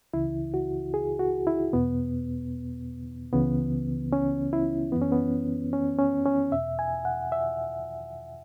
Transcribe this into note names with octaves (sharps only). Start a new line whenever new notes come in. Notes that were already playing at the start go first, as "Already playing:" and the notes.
C#2 C#3 E3 E4
F#4
G#4
F#4
E4
E2 B2 B3
C#2 C#3 E3 B3
C#4
E4
F#2 E3 B3
C#4
B3
C#4
C#4
C#4
E2 B2 E5
G#5
F#5
E5